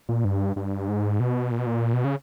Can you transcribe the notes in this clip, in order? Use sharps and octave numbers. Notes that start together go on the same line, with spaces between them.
A#2
G2
G2
G#2
B2
A#2
B2
A#2
B2
C#3